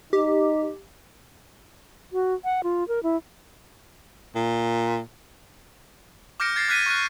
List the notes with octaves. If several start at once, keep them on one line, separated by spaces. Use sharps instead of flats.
D#4 G4
F#4
F#5
F4
A#4
E4
A#2
D6 F6 G6 A#6 C#7 D7
G#6 A6 C7
D6 F6 F#6 G#6 B6 D#7
C#6 F6 F#6